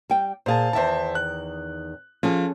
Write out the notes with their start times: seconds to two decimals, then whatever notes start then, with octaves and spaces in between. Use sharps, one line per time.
0.10 G3 G5
0.46 A#2 G#4 C5 F5 A5
0.73 E2 D#3 C5 E5 A5
1.15 F#6
2.23 F3 C#4 G#4 A4